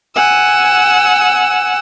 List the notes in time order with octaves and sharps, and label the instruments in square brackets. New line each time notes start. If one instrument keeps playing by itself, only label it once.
[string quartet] F#5 G#5 E6